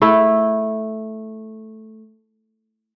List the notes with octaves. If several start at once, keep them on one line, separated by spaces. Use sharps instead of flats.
A3 E4